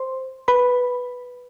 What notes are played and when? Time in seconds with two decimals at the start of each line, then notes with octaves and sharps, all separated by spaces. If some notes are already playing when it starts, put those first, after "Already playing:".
Already playing: C5 C6
0.48 B4 B5